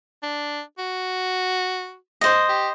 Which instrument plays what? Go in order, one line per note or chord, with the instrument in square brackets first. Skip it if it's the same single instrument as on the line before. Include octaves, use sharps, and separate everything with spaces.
[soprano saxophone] D4
F#4
[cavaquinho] C5 D#5
[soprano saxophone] G4